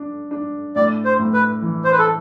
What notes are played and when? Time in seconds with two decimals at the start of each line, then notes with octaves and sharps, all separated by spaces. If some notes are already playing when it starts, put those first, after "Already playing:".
Already playing: D4
0.31 D4
0.76 A2 D5
1.05 C5
1.19 A2
1.33 B4
1.62 E3
1.84 C5
1.92 B4
1.99 A4